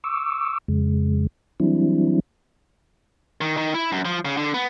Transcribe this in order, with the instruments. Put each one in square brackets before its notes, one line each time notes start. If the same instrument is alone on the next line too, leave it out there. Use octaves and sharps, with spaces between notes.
[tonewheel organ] C#6 D6 E6
F2 C#3 G#3
E3 F#3 G3 C4 D4 E4
[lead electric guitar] D#3
D#3
E4
F#2
F3
C#3
D3
B3